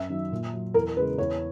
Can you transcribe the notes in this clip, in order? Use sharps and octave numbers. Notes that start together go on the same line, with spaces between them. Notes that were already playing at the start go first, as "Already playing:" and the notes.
Already playing: F#2 E5
D#3 F#3
A#2
F#3
E2 A#4
C#3 G#3 B4
E2 C#5